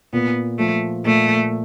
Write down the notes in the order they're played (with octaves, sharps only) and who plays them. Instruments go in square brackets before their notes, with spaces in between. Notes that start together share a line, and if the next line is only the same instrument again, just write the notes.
[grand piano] A#2 [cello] B3
[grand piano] F3 [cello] A3
[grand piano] A#2 [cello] A3